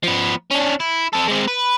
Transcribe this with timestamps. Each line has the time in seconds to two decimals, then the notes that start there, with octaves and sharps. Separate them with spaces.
0.03 F3 B3
0.51 C#4 D4
0.80 E4
1.13 C4 A4
1.28 G#3 C4
1.48 B4